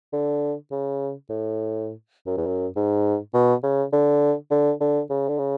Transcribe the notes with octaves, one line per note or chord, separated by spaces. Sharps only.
D3
C#3
A2
F#2
E2
F#2
G#2
B2
C#3
D3
D3
D3
C#3
D3
C#3